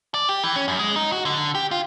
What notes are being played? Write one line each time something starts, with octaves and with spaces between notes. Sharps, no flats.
D5
G4
E3
C#4
F#2
G#3
D#4
F#4
D3
G4
F4